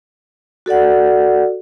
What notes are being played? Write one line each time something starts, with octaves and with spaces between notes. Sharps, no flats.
F#4 A4 D5 F#5